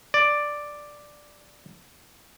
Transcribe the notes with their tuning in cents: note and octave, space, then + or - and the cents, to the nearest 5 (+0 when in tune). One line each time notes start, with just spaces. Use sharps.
D5 +5